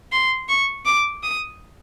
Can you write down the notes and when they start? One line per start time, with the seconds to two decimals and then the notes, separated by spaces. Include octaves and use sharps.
0.12 C6
0.49 C#6
0.86 D6
1.23 D#6